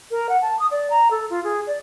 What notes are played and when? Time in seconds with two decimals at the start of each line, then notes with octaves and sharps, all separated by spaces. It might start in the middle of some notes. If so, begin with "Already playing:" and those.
0.11 A#4
0.29 F#5
0.42 A5
0.59 D#6
0.71 D5
0.90 A#5
1.11 A4
1.30 F4
1.44 G#4
1.67 D5